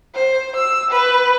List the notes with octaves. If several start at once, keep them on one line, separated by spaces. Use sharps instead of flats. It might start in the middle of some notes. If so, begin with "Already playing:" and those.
C5
E6
B4